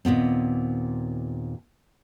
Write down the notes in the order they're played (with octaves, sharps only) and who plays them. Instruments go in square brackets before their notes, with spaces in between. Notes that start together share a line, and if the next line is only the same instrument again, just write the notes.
[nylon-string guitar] D#2 A#2 B3 C4